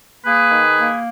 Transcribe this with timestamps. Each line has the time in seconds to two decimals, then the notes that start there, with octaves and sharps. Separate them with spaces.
0.25 A#3 G#4 B4
0.52 D#3
0.77 A#3